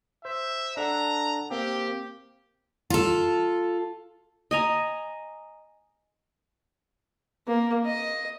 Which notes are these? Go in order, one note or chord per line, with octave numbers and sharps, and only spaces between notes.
C5 E5
D4 A4 F#5 A#5
A#3 C4 G4
F4 A4
D#5 G#5 A#5
A#3
D#5